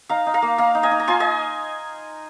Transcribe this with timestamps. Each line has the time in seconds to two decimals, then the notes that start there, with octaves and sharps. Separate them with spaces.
0.09 D#4 F5 A#5
0.26 D#4
0.34 F5 A#5
0.42 A#3
0.58 A#3 F5 A#5
0.75 D#4
0.83 D#5 G#5
0.91 D#4
1.00 A#5
1.07 F4 G#5 C6
1.20 D#5 G#5